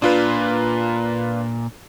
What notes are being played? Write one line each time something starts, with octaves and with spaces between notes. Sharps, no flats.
A#2 D4 F4 B4